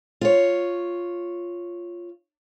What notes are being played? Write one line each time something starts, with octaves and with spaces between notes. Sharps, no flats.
F4 C#5